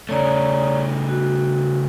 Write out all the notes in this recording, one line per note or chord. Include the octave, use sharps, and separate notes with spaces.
C#3 A3 C#5 D5 A#5
F#4